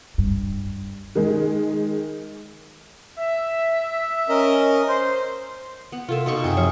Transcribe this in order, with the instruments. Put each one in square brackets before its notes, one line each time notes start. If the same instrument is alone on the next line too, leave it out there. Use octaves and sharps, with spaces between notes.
[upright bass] G2
[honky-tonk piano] D#3 G#3
[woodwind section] E5
[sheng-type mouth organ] C#4 A#4 D#5
[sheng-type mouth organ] C5 [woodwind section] C6
[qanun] B3
[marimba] C3 A4 A#4 [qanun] F4 E5
[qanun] B2 D#4 C#6
[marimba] F#2 [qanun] C4 G#4
[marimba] F3 C#5 [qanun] C#6